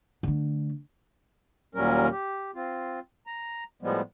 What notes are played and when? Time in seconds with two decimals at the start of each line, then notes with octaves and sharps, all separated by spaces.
0.23 D3 A3
1.75 D#2 A#2 F#3 G3 C#4 A#4
2.11 G4
2.55 C4 F4
3.27 A#5
3.82 A2 F3 G3 G#3 B3